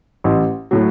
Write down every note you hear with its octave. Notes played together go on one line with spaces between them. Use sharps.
A1
A2 F#3